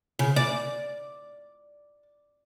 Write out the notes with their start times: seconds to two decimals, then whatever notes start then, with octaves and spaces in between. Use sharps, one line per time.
0.19 C#3
0.36 D5